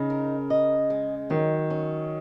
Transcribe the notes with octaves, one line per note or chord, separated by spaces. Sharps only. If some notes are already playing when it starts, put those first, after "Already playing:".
Already playing: C#3 D#4
A#4
D#5
G#3
D#3 F#3
C#4